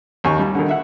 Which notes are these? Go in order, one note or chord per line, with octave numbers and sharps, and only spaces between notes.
D#2 D#3 G#5 C#6
G3
D3 D#3
E5 F#5